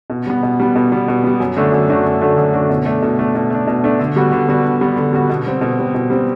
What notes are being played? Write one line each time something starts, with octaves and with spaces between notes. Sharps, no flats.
B2
G3 B3
B2
G3 B3
B2
G3 B3
B2
G3 B3
F#2
D3 A3 D4 F#4
F#2
D3 A3 D4 F#4
F#2
D3 A3 D4 F#4
F#2
D3 A3 D4 F#4
B2
A3 D4
B2
A3 D4
B2
A3 D4
B2
A3 D4
D3
G3 B3 F#4
D3
G3 B3 F#4
D3
G3 B3 F#4
D3
G3 B3 F#4
B2
G3 C4
B2
G3 C4
B2
G3 C4